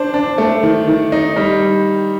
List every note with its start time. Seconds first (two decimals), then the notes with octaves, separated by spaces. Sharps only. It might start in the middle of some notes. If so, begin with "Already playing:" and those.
Already playing: D4 C5
0.14 D4
0.38 A3
0.63 D#3
0.87 D#3
1.12 D#4
1.36 G3